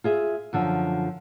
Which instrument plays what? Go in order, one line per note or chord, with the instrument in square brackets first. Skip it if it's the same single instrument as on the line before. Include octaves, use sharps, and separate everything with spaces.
[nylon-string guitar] F4 G#4 E5
F#2 D3 F3